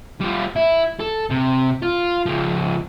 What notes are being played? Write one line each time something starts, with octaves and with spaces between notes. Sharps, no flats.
G3 F4
E4
A4
C3
F4
C#2 F3